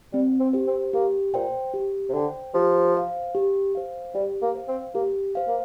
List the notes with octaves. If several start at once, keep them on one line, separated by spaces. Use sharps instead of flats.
G3 C4
C4
G4 C5
C4
A#3 G4
A#2 C5 G5
G4
C3
D3 C5 G5
F3 G4
C5 F5
G4
C5 F5
G3 G4
A#3
C5 F5
C4
A#3 G4
C5 F5
A#3